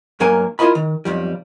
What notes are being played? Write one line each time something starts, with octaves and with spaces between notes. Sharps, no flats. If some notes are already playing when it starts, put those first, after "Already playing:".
B1 G2 F#3 A#3 A#4 G#5
E4 F4 A#4 D#5 B5
D#3
B1 F2 G3